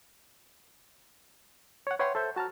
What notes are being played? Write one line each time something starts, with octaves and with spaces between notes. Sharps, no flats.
C#5 F#5
B4 C#5 E5 F#5 G5 C6
A4 C5 E5 G6
F#4 A5 A#5 F6